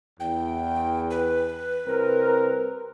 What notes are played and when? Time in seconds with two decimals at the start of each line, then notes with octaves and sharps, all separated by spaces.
0.20 E2 G5
1.11 B4
1.86 C2 C4 A#4